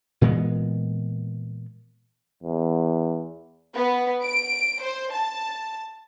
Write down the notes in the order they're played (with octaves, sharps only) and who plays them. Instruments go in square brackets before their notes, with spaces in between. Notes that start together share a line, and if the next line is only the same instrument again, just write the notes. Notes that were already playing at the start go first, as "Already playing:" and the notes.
[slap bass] A#2 E3 G#3 B3
[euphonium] E2
[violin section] B3
D7
C5
A5